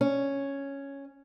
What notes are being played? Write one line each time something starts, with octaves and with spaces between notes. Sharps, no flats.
C#4